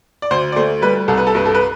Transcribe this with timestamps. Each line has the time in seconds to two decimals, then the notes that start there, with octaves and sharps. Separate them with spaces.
0.22 D5
0.31 D2 C5
0.52 D5
0.56 A3 C5
0.82 G3 B4
1.08 C2 A4
1.18 B4
1.27 A4
1.35 G2 B4
1.46 A4
1.55 B4